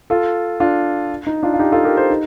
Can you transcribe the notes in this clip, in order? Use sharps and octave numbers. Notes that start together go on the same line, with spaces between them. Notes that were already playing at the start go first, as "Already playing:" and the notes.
F4 A4
D4 F4
D#4
D4 F4
F4
D#4 G4
F4 A4
G4 A#4
A4 C5
D#4